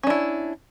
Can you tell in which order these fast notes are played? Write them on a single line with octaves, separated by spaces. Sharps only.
C#4 D4 E4